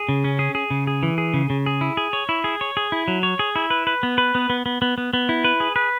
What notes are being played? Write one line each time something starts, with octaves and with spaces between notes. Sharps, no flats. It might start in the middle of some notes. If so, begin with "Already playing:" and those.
Already playing: G#4
C#3
C#4
G#4
G#4
C#3
G#4
E3
G#4
C#3
C#3
G#4
E4
G#4
C#5
E4
G#4
C#5
G#4
E4
F#3
C#5
G#4
E4
B4
B4
B3
B4
B3
B3
B3
B3
B3
B3
E4
B4
G#4
B4